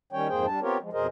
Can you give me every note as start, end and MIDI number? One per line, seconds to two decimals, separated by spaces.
0.13 0.28 51
0.13 0.28 55
0.13 0.28 61
0.13 0.28 73
0.13 0.28 79
0.29 0.46 41
0.29 0.46 44
0.29 0.46 58
0.29 0.46 68
0.29 0.46 72
0.29 0.46 79
0.46 0.60 55
0.46 0.60 62
0.46 0.60 81
0.61 0.77 59
0.61 0.77 60
0.61 0.77 65
0.61 0.77 67
0.61 0.77 70
0.61 0.77 73
0.81 0.90 53
0.81 0.90 56
0.93 1.07 41
0.93 1.07 47
0.93 1.07 68
0.93 1.07 70
0.93 1.07 72
0.93 1.07 75